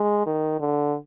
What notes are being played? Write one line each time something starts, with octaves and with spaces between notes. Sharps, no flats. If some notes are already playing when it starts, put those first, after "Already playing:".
Already playing: G#3
D#3
D3